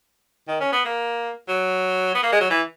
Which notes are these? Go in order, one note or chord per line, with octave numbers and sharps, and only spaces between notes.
D#3
C#4
B3
A#3
F#3
B3
A#3
G#3
F#3
E3